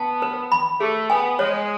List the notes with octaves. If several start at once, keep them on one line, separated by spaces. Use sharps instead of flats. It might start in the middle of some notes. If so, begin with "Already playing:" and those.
Already playing: B3 A5
B4
B5
A3 G#4
B3 G#5
G#3 C#5